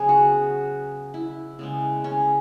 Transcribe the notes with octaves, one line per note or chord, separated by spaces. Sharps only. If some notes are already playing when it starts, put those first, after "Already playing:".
Already playing: C#3 F#3 B3 G#4
F#4
E4
C#3 G#3 B3
C#4